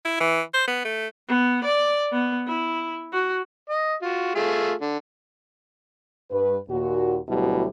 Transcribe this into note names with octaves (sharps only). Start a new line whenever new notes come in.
E4
E3
C5
B3
A3
B3
D5
B3
E4
F#4
D#5
F4 F#4
A3 F4 G#4
D3
G2 B4
D#2 A#2 F#4
D2 B2 F#3 G3 E4 G4